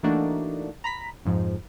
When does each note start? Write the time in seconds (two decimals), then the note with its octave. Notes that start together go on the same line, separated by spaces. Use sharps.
0.03 E3 A3 A#3 D4 D#4 F#4
0.84 A#5 B5 B6
1.25 F2 G#2 F3